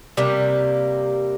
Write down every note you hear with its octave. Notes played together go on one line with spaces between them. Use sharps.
C3 G3 A#3